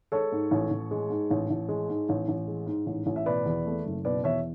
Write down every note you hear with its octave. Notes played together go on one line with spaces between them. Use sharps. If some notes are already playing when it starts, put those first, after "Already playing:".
G#3 A4 C#5
G#2
A1
A1
G#3
G#2
A1
A1
G#3
G#2
A1
A1
G#3
G#2
A1
A1
E5
B2 B4 D5
E2
A3
F#1
B2 B4 D5
E2 C#5 E5